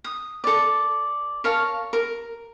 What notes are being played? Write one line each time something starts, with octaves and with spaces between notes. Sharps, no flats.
D#6
A4 D5
A#4 C#5 F5 A5
A#4